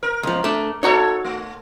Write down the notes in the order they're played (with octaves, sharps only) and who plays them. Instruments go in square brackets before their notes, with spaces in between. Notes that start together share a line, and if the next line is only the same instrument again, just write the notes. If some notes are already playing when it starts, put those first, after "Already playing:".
[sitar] A#4
[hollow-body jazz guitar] C#2 F3
A3 D4
[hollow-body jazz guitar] D#4 F#4 A#5 [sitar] A4 B4 C#5
[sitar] A3